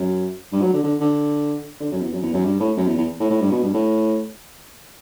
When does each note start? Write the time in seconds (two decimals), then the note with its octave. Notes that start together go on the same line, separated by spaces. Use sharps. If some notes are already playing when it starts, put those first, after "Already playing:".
Already playing: F#2
0.52 G2
0.62 F#3
0.73 D3
0.83 D3
1.00 D3
1.80 D3
1.91 F#2
2.02 E2
2.13 F#2
2.22 E2
2.33 F#2
2.45 G2
2.60 A2
2.77 F#2
2.87 E2
2.97 E2
3.19 A2
3.30 A2
3.41 G2
3.51 B2
3.62 G2
3.73 A2